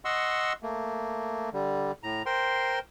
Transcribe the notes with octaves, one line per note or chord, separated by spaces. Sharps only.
D#5 F#5 C6 C#6 E6
A3 A#3
D3 G3
A2 A#5
A#4 C5 G5 C6